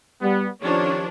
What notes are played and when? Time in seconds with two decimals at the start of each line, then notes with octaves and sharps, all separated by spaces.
0.21 G3 B3
0.61 D#3 F3 C#4 D4 G4 C#5